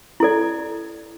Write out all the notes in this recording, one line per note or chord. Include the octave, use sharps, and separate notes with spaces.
E4 A4 D5